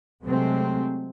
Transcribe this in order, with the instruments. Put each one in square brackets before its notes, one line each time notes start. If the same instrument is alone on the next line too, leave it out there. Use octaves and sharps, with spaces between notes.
[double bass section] C3 F#3 G#3 A3 C4